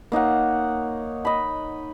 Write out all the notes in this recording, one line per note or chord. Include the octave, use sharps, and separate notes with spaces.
A#3 D#4 C#5 F#5
D#5 B5